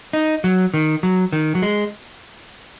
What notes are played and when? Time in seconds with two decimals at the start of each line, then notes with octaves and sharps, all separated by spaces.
0.13 D#4
0.44 F#3
0.74 D#3
1.03 F#3
1.33 D#3
1.55 F#3
1.62 G#3